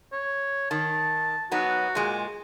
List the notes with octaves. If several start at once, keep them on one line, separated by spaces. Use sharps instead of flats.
C#5
D#3 A5
F#3 B3 D#4 F#4
A#2 G#3